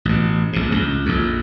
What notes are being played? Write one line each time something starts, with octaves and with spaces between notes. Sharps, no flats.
A1 B2
A#1 G#2
C#2
A#1 F2